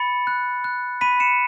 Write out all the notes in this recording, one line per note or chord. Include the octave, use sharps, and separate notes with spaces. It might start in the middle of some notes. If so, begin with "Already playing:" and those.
Already playing: B5 A6 C#7
F#6
F#6
B5 B6 D#7
C#7 E7